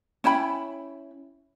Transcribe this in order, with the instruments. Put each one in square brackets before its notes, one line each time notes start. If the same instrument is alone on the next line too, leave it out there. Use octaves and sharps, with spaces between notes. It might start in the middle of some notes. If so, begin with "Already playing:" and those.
[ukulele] C#4 E4 G5 B5